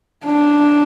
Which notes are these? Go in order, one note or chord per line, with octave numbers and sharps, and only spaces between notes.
D4